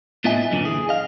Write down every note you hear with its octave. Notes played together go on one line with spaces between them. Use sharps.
A2 B3 F4 D#5 E5 G#5
F#2 A#2 D3 E3
G#4
D#5 F5